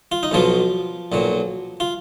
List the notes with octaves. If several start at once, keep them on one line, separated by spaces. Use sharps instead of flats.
F4
D#4
B1 B2 F3 F#3 F4
B1 A#2 F#3
F4